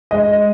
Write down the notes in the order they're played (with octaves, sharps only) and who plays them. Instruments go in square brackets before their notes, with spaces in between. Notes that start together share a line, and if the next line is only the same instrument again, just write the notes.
[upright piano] G#3 [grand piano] D#5